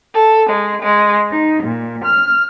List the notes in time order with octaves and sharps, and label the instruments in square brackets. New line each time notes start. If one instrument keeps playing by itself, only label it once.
[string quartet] A4
G#3
G#3
D#4
A#2
F6